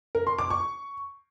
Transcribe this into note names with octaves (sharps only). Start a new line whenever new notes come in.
A#4
C6
D6
C#6